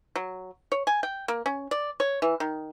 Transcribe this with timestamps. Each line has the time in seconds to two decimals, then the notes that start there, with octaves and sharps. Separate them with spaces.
0.16 F#3
0.72 C#5
0.87 G#5
1.03 G5
1.28 A#3
1.46 C#4
1.71 D5
2.00 C#5
2.22 E3
2.40 D#3